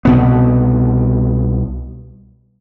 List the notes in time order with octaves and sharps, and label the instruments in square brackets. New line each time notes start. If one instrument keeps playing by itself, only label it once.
[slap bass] C2 B2 B3